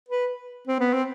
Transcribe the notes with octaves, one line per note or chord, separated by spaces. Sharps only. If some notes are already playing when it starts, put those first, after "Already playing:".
B4
C4
B3
C4